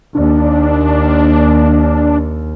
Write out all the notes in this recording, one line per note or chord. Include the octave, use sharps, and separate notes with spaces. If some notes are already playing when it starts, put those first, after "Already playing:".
D#2 D4